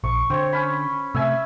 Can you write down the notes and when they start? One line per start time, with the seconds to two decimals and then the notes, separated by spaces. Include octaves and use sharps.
0.04 A#1 C#6
0.30 D3 C4 C#5
0.53 C#4 B5
1.15 C3 A3 E5 G#5 E6